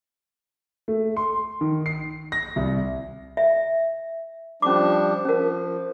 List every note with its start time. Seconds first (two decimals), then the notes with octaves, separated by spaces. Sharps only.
0.88 A3
1.17 C6
1.61 D#3
1.86 C7
2.32 A#6
2.56 C2
3.37 E5
4.62 F3 G3 C#4 D4 D6
5.25 F3 C#4 A#4